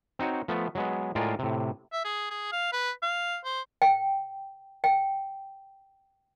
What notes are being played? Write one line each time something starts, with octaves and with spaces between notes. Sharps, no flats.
C4 D#4 F#4 C#5
F3 A3 B3
F#3 G#3 B3
A2 G#3 F4 A#4 D5 G#5
A2 C3
E5
G#4
G#4
F5
B4
F5
C5
G5
G5